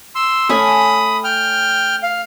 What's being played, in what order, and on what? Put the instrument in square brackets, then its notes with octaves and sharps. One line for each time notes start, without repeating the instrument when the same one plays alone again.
[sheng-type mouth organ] C6 E6
[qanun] A3 C#4 G#5 [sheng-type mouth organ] B5 D#6
[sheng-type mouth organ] G5 F6
F5